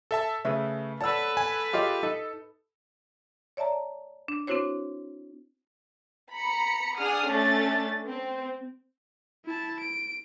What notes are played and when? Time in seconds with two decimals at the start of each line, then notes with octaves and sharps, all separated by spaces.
0.11 A4 E5 A5
0.45 C#3 A3 G#4 B4 E5
1.01 A4 B4 C#5 D5 F#5 A5 E6
1.37 G#5
1.73 F4 G4 G#4 C#5 D#5 F5
2.03 D#4 A4
3.57 C#5 D5 E5 A5 A#5
4.28 D4
4.47 C4 D4 E4 F#4 C5 C#5
6.35 A#5 B5 C#7
6.98 D4 G#4 F#5 D#6 F6
7.28 A3 C#4 D4 A4 A6
8.05 C4
9.46 E4 A5
9.80 D7